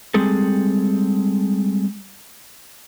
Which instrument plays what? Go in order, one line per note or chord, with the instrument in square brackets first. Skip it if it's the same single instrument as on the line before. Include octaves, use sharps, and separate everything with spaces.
[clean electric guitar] G3 G#3 C4 G#4 A4